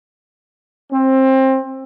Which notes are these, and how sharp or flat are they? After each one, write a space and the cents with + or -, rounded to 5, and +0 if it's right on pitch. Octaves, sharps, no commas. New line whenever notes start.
C4 +20